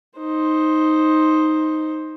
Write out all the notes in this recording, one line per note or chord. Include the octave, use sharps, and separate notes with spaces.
D#4 C5